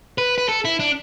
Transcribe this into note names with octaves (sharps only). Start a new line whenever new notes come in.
B4
B4
A4
E4
D4